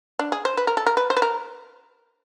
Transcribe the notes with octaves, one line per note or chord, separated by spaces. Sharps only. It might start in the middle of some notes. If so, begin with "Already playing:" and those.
D4
G#4
C5
B4
A#4
A4
A#4
B4
C5
B4
A#4